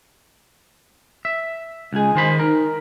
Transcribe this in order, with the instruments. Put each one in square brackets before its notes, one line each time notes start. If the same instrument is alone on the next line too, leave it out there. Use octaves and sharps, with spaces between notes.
[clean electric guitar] E5
[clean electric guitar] C#2 G#4 [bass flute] G#3
[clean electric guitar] D#3 C5 B5
[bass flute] D#4 [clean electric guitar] A#4